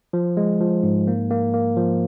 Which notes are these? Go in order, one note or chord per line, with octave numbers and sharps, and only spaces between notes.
F3
G#3
F3
G#2
A#3
A#3
A#3
F3